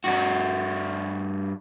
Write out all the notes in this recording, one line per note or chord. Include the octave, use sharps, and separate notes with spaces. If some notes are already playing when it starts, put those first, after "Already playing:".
G2 F#4